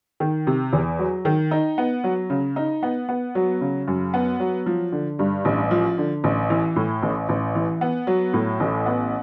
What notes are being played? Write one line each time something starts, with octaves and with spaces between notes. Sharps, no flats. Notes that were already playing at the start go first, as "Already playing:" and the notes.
D#3
C3
E2
F#3
D#3
D#4
B3
F#3
C#3
D#4
B3
B3
F#3
C#3
F#2
B3
F#3
F3
D3
G2
A1
F3
D3
A1
E3
A2
A1
A1
E3
B3
F#3
A2
A1
B3